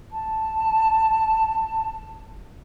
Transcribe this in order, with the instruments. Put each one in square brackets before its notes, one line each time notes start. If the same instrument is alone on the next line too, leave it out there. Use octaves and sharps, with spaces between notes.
[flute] A5